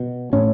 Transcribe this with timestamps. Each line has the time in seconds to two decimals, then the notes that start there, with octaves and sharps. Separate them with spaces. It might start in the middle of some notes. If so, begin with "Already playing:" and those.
Already playing: B2
0.33 A2 C#4